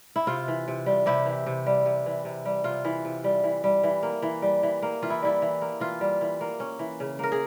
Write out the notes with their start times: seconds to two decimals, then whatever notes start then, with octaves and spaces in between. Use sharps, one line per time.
0.16 E4
0.27 C3 F4
0.48 E3
0.68 C3
0.86 G3
1.06 C3 E4 G4
1.26 E3
1.46 C3
1.66 G3
1.86 C3
2.06 E3
2.25 C3
2.45 G3
2.64 C3 F4
2.85 E3
3.05 C3
3.24 G3
3.44 E3
3.64 G3
3.83 E3
4.03 A#3
4.22 E3
4.42 G3
4.63 E3
4.82 A#3
5.02 E3 F4
5.10 E4
5.22 G3 E4
5.42 E3
5.61 A#3
5.80 E3 F4
6.01 G3
6.21 E3
6.41 A#3
6.60 C#4
6.79 E3
7.00 C#3
7.19 A#3 A#4
7.32 G#4